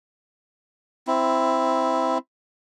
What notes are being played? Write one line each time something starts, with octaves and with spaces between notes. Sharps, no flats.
C4 E4